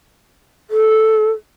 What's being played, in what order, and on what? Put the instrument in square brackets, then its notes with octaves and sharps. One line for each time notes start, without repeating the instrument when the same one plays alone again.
[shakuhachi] A4